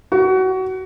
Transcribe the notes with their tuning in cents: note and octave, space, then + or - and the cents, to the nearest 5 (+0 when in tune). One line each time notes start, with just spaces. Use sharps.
F#4 +20